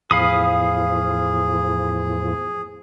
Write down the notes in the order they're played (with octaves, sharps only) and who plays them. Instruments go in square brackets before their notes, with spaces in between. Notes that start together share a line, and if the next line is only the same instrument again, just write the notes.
[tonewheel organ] E2 A2 F3 [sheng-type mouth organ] G#4 [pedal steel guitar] F5 B5 D#6